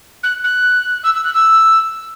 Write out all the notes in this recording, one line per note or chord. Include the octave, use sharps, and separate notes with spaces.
F#6
F#6
E6
E6
F#6
E6